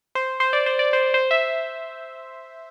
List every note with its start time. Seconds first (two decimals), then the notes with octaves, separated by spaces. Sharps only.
0.15 C5
0.40 C5
0.53 D5
0.66 C5
0.79 D5
0.93 C5
1.14 C5
1.31 E5